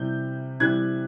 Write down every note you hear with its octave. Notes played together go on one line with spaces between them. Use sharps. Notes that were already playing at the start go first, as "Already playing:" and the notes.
Already playing: C3 E3 G3 G6
C3 E3 G3 F#6 G#6